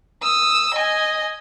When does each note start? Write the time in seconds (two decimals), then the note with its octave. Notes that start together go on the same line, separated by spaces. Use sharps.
0.22 D#6 E6
0.73 D#5 G#5